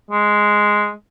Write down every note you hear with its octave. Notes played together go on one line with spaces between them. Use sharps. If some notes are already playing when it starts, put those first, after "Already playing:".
G#3